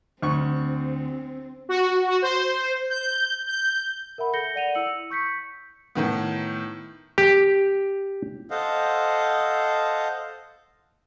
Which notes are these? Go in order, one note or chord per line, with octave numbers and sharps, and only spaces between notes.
D2 C4 C#6
F#4
F#4
C5
G6
G6
A#4 E5 F#5 B5
A4 G6 A#6 C#7 G7
D5 F#5 D#7 F7
E4 E6 C#7 F#7
C#6 G6 B6 C#7
A2 D#3 B3
G4
A4 C5 D#5 F5 F#5